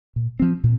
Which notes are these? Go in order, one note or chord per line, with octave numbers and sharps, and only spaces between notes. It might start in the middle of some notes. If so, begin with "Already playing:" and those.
A#2
F3 C4
A#2